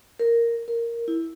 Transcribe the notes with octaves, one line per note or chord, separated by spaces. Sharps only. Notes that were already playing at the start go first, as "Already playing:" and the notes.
A#4
A#4
E4